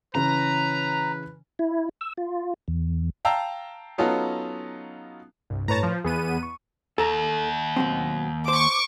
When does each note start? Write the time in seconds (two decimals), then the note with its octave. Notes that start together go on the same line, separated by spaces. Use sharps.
0.15 C#3 E3 C#4 B4 A#5
1.59 E4
2.01 E6
2.18 F4
2.68 E2
3.25 F5 G5 A5 A#5 E6
3.98 F#3 B3 C#4 D#4 F4 A4
5.50 C2 G2
5.68 A2 B4 C#5 A5 A#5
5.83 F3
6.05 E2 E3 B3 G#4 D#7
6.43 C#6
6.98 D#2 A4 A#5
7.76 B2 F#3 C4
8.48 C5 C#6 D6